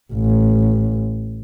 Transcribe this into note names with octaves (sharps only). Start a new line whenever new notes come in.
A1